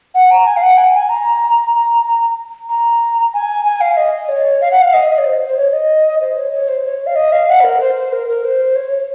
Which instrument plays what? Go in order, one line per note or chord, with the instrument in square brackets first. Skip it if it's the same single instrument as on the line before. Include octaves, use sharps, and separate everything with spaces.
[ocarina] F#5
A#5
G#5
F5
F#5
G#5
G#5
A#5
A#5
A#5
A#5
G#5
G#5
F5
D#5
C#5
F5
F#5
F5
D#5
D#5
C#5
C5
C5
C#5
D#5
C5
C#5
C#5
C5
C#5
F5
D#5
F5
F#5
C5
A#4
C5
C5
A#4
A#4
C5
C#5